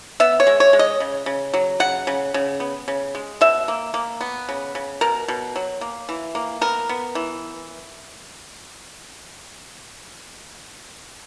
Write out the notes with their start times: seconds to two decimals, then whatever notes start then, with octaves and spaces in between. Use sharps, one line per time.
0.20 B3 E5
0.40 C#5
0.47 G#3
0.60 C#5
0.73 G#3
0.79 D#5
1.00 C#3
1.26 C#3
1.54 F#3
1.80 C#3 F#5
2.07 C#3
2.34 C#3
2.60 B3
2.88 C#3
3.15 G#3
3.41 B2 E5
3.68 A#3
3.94 A#3
4.21 B3
4.49 C#3
4.75 C#3
5.01 B2 A#4
5.28 B2
5.56 F#3
5.81 A#3
6.09 E3
6.35 A#3
6.61 B3 A#4
6.89 B3
7.15 E3